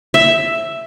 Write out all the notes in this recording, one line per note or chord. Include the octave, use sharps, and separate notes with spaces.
E5